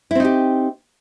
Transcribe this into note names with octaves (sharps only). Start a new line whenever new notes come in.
C4 D#4 E4 G4